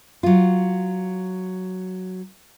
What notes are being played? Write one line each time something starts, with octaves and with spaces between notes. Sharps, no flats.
F#3 F4